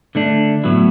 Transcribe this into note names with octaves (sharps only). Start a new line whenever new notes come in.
D3 A3 D4
A2 F#3 B3 E4